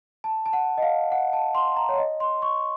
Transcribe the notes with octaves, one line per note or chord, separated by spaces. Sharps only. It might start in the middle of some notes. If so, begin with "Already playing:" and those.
A5
A5
F#5
D#5
F5
F#5
A5
C6
A#5
C#5
D#5
C6
C#6